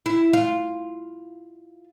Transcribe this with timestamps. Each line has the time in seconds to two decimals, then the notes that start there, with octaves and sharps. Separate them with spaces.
0.06 E4
0.33 F4